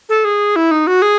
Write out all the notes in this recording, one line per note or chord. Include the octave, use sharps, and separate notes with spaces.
A4
G#4
E4
D#4
F#4
G#4